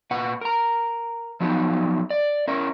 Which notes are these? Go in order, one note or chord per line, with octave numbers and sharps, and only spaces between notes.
A#2 B4 F#5
A#4 A#5
F3 F#3 B3 D#4 G4
D5
C#4 E4 A#4